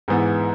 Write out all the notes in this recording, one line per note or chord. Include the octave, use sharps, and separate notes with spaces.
G#2 E3 B3